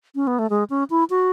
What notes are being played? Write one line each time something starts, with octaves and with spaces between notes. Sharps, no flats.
C#4
B3
A3
G#3
C#4
E4
F#4